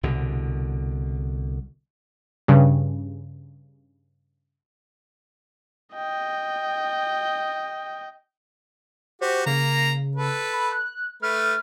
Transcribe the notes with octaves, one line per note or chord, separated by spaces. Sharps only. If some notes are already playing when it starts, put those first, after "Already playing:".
C2 B2 D3
G2 C#3
D#5 G5
F#4 G4 C5
C#3 A#3 A#5
A4 B4
B5
F#6
A3 B4 F6